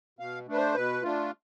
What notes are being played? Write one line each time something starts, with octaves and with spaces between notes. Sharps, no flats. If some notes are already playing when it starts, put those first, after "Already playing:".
B2 F5
A3 D4 B4
C5
B2 B4
A3 D4 F4